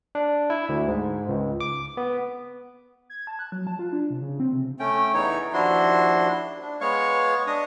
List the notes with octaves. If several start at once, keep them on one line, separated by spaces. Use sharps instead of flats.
D4
E4
D2
G#2
C#2
D6
B3
G#6
A5
F#6
F#3
A5
F4
D4
C3
C#3
C4
C3
A3 C#4 G5
E2 E3 D#4 C#5
D#2 F3 D4 E4 F#4 C6
D4
G#3 B3 C#5 F5 C#6
D4 D#5 D#6